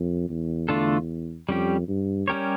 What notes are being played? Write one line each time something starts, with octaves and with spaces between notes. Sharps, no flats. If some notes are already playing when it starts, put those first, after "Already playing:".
Already playing: F2
E2
E2 D3 A3 D4 F4 A4
F2 G3 C#4 G4
G2
G3 C#4 G4 A#4 C#5